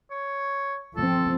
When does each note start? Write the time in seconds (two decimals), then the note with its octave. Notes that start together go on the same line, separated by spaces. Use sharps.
0.11 C#5
0.96 F3 C4 A4